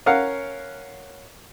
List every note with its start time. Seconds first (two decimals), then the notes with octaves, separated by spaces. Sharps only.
0.06 C#4 A#4 F5 F#5